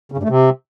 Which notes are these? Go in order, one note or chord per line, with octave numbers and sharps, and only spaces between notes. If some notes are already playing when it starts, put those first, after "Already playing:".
C#3
G2
A3
C3